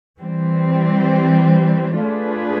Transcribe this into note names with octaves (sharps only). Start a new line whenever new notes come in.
E3 G3 C4
A3 D4 F4 G#4 B4